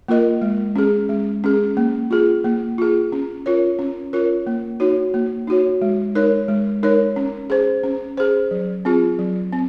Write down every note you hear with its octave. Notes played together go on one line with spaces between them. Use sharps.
A#3 F4 A#4 D#5
G#3
C#4 G#4
G#3
C#4 G#4
A#3
F4 G#4
A#3
F4 G#4
C#4
F4 A#4 C#5
C#4
F4 A#4 C#5
A#3
D#4 F#4 C#5
A#3
D#4 F#4 C#5
G#3
D#4 A#4 C#5
G#3
D#4 A#4 C#5
C#4
G#4 C5
C#4
G#4 C5
F#3
C4 F4 G#4
F#3
C4